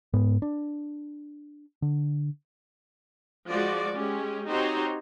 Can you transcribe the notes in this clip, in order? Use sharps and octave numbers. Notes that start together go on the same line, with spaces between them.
G#2 B3
D4
D3
F3 G#3 F#4 D5
G#3 C#4 G4
C4 D#4 F#4 G4 C5 C#5